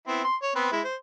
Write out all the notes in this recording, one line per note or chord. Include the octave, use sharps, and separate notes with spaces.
B3 C4 E4
C6
C#5
B3 C4 B4
G#3 E4
C5